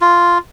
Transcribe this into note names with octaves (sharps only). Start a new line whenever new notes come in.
F4